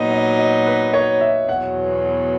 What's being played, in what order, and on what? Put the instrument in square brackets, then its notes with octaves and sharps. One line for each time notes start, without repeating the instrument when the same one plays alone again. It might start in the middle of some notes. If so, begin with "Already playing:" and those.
Already playing: [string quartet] A#2 F#3 B3 D#4 [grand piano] D#5
[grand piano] D#5
D#5
B4
C#5
E5
[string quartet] E2 B2 F#3 [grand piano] F#5